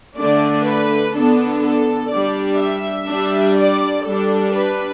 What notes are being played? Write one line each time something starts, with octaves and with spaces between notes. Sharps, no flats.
D3 A3 D4 D5
B4
D3 B3 D4 A4
A4
G3 D4 D5
E5
G3 D4
D5
G3 D4 A4
B4